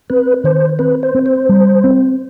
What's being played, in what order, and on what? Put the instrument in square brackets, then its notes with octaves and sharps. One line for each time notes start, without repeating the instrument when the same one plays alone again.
[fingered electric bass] C4 [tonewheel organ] B4
[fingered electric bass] D#3 [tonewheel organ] C5
[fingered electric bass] C4 [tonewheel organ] B4
[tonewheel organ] C5
[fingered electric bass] C4
[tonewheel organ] C5
[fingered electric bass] G3
C4